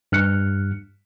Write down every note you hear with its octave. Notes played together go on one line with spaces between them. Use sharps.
G2 F6 F#6 C#7